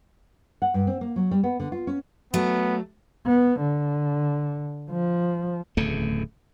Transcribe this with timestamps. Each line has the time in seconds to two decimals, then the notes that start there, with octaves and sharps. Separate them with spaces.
0.62 F#5
0.74 G2
0.87 C4
1.01 A#3
1.16 F#3
1.31 G3
1.43 B3
1.60 D3
1.72 F4
1.87 C#4
2.34 F#3 A3 B3
3.26 B3
3.60 D3
4.91 F3
5.77 D1 E2 C#3 A3